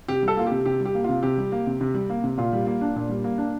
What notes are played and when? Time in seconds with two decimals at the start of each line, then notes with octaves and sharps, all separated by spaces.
0.08 C3 G4
0.23 G3 A4
0.37 A#3 F4
0.46 C3 G4
0.66 C3 G4
0.80 G3
0.85 G4
0.95 A#3
1.04 C3 F4
1.23 C3 G4
1.37 G3
1.52 A#3
1.67 C3
1.81 C3
1.94 G3
2.10 A#3
2.24 C3
2.38 A#2 F4
2.53 G3
2.67 A#3
2.81 D4
2.96 A#2
3.09 G3
3.24 A#3
3.38 D4